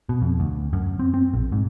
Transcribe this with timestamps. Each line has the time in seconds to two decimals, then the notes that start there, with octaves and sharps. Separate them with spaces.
0.09 B2
0.22 F2
0.40 D2
0.73 F#2
0.99 C4
1.14 C4
1.34 A#1
1.52 G#2